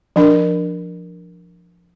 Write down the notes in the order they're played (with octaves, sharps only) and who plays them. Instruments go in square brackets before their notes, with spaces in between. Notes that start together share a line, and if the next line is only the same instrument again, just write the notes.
[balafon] F3 D4 A#4